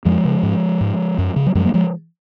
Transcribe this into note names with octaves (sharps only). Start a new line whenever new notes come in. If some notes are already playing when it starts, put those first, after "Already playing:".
F2 F3 G#3
C#3
G#2
G#2
F#2
C#3
F#3
F#2 F3 G#3
F#3 A#3
F3 G#3